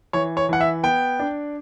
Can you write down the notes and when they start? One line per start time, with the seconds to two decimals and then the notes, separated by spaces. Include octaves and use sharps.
0.13 E3 C#5
0.37 C#5
0.49 E3 F#5
0.61 E5
0.83 B3 G5
1.20 D4